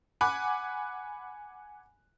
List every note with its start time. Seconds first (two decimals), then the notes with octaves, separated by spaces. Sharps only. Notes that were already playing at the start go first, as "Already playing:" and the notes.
0.21 F#5 G#5 B5 D6 F#6